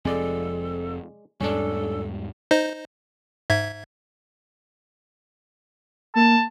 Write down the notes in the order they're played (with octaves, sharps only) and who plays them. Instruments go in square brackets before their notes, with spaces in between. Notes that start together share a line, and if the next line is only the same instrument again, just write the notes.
[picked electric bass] F1 F2 C4 [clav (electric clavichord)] G#3 D5 [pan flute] A4
[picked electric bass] E2 G#2 G3 [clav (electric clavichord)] C#4 D4 [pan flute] A4
[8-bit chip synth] D#4 C5 D#5
G#2 E5 G#6
[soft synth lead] A#3 [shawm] A5